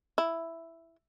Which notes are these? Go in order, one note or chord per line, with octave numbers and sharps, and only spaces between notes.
E4